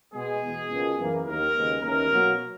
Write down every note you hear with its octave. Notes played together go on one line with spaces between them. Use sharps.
B2 G#3 B3 G#4
E2 B2 G#3 B3
C#2 B2 A#3
F#2 E3 A#3
D#2 D#3 A#3 A#4
D#2 C#3 G#3 B3
D#2 C#3 E3 A#4
B2 F#3 A#3